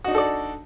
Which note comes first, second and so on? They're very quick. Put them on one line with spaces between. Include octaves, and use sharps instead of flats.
F#4 D#4 D4 A4 D5